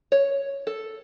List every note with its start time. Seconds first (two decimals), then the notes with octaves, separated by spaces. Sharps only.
0.12 C#5
0.67 A4